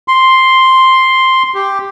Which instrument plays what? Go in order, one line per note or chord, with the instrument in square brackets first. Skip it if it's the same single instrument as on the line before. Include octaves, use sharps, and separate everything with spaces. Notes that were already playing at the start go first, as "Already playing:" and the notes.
[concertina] C6
G4